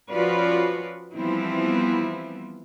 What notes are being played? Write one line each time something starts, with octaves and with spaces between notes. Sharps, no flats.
F3 C#4 F4 F#4 B4 D5
E3 F3 G3 B3 C4 E4